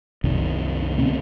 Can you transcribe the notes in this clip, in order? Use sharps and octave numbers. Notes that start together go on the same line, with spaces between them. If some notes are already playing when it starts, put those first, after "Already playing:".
C2 F#2 C3 D#3
D2 B2 C4 C#4